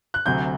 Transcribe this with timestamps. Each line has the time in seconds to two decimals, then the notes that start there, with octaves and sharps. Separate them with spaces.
0.14 F#6
0.26 D2 C3 F#3 G6